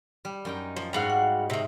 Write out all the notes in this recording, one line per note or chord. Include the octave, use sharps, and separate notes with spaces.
G3
F#2 D#4 G5
F3
G#2 G3 F#4 D5 F5
F#5
C3 D#3 E5